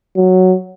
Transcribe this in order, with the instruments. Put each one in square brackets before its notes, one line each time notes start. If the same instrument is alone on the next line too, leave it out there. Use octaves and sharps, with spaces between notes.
[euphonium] F#3